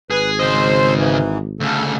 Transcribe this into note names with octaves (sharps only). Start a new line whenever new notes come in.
G#1 G#4 B4
C#3 C5 D#5
G#2 E3
D2 C#3 A4